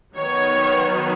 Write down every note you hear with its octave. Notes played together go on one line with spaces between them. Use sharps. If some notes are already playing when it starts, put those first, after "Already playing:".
D#3 F#3 B3 C#5